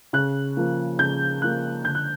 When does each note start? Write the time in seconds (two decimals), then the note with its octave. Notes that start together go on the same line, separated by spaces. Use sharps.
0.13 C#3 F#6
0.57 F3 A#3
0.99 C#3 G6
1.42 F3 A#3 F#6
1.84 D3 G6
1.95 F#6